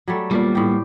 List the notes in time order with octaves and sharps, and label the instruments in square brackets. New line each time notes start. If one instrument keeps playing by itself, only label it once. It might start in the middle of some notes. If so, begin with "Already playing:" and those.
[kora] F#3 G3 A3
[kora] A#2 D5 [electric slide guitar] G3 A#3 B3
[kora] A2 G4